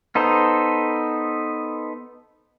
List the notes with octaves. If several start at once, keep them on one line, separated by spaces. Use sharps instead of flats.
B3 D#4 A4 C5